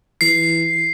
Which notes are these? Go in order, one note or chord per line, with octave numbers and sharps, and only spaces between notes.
E3 C7